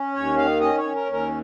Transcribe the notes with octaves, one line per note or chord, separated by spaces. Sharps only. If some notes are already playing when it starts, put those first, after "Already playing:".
Already playing: C#4
D#2 C#5
D#3 F5
C#4 D#5
C#5
C#4
A#4
D#2
A#4